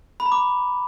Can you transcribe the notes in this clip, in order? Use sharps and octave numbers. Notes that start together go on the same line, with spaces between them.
B5
A#5
D6